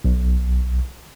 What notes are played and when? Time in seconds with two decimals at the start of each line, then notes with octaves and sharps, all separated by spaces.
0.05 B1